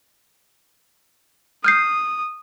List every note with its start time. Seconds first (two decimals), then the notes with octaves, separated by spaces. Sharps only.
1.64 D#6 F6 G6 C7